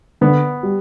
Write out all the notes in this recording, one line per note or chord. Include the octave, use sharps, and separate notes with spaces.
D3 B3
G3